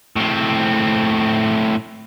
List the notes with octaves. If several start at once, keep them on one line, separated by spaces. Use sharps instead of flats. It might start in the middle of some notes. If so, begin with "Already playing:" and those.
A2 C4